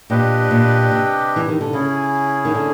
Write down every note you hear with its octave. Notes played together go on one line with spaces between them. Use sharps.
A#2 D4 G4 B4 D#5 G5
A#2
C3
E3
D#3
D3
C#3 C#4 E4 G#4
D#3
D3